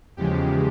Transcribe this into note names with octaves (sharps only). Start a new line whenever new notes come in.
E2 C#3 F3 G#3 G4